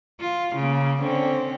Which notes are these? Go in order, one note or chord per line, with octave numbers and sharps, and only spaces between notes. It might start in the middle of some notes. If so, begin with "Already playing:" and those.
F4
C#3 A#3
D3 C4 C#4